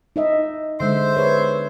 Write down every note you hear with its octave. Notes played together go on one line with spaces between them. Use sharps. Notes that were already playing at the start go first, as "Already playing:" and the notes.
D#4 D#5 E5
D3 G#3 C5 E5
G#4 B4 C#5